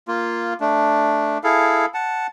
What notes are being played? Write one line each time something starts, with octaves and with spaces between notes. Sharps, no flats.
A#3 F4
A3 D4
E4 G#4 A4 F5
F#5 A5